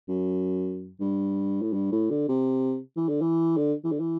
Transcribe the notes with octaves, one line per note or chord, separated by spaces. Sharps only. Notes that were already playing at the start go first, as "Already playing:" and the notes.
F#2
G2
A2
G2
A2
D3
C3
E3
D3
E3
D3
E3
D3
E3